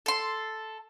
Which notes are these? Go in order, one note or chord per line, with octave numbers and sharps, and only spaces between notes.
A4 C6